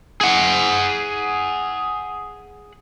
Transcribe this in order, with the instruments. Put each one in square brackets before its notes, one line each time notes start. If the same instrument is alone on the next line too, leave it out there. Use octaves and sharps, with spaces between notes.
[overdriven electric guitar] G#4 F#5